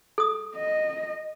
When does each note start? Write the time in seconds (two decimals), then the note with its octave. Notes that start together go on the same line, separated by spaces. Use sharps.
0.18 A4 D#6
0.56 D#5